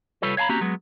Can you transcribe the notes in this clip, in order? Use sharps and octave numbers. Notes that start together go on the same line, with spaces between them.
C2 G3 F4 A4 B4 C#5
C#5 F5 G#5 A#5 B5
A#3 C4 C#4 F#4 G4 A#5
F#3 G#3 B3